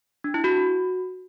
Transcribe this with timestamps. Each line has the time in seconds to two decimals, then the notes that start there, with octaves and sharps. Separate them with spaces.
0.24 D4
0.34 E4
0.44 F#4